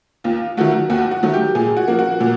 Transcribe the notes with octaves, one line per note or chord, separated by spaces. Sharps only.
D#2 F4
D#3 F#3 A3 F#4
D#2 F#4
F#4
D#3 F#3 A3
G4
A#2 G#4
F#4
F3 A#3
F#4
A#2